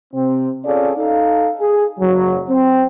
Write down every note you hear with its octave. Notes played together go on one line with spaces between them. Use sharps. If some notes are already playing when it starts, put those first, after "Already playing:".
C3 C4
C#4 F4 G#4 A4 C#5 D5
D#4 A4 F5
G#4
F#1 G#2 C#3 F#3
C4